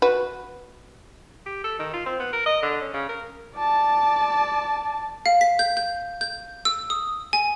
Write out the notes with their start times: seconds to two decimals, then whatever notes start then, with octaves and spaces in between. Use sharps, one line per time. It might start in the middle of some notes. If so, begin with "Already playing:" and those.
0.02 F#4 B4
1.46 G4
1.64 A4
1.79 D#3
1.93 F4
2.06 C4
2.20 B3
2.32 A#4
2.46 D#5
2.62 D3
2.81 C#4
2.94 C#3
3.09 A#4
3.56 D5 A5
5.26 F5
5.41 B6
5.59 G6
5.77 G6
6.21 G6
6.65 E6
6.90 D#6
7.33 G#5